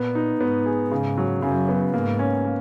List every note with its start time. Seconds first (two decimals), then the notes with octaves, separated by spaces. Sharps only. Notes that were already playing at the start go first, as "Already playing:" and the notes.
Already playing: A#2 B3
0.15 D#4
0.41 G#2 B3
0.66 G#4
0.91 G#2 C#3
1.18 F#3
1.42 F#2 C#3
1.69 B3
1.93 G#2 A#3
2.19 C#4
2.45 A#3